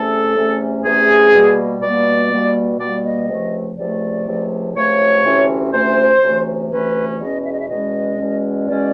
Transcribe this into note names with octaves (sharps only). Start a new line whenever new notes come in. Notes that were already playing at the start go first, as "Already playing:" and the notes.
Already playing: E2 C3 E3 A3 C#4 A4
E2 C3 E3 A3 C#4
E2 C3 E3 A3 C#4 G#4
B2 G3 A#3
B2 G3 A#3 D5
B2 G3 A#3
B2 G3 A#3 D5
D#5
C#2 C3 F3 A3
C#2 C3 F3 A3 D5
C#2 C3 F3 A3
C#2 C3 F3 A3 C#5
D2 C3 E3 A3 C#4
D2 C3 E3 A3 C#4 C5
D2 C3 E3 A3 C#4
D2 C3 E3 A3 C#4 B4
E2 B2 G#3 C#4 D#5
E5
D#5
E5
E2 B2 G#3 C#4 D#5
E2 B2 G#3 C#4
E2 B2 G#3 C#4 D5